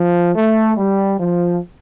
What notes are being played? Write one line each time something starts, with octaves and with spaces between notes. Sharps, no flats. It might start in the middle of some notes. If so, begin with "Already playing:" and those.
Already playing: F3
A3
G3
F3